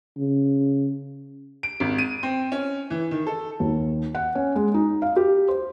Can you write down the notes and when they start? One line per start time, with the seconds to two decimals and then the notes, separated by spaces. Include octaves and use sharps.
0.18 C#3
1.63 D7
1.80 G#1
1.98 D#7
2.23 C4
2.52 C#4
2.90 E3
3.11 D#3
3.27 A4
3.60 D#2
4.15 F#5
4.35 C#4
4.56 G#3
4.74 D#4
5.02 F5
5.16 G4
5.48 C5